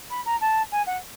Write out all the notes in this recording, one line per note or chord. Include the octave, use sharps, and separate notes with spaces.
B5
A#5
A5
G#5
F#5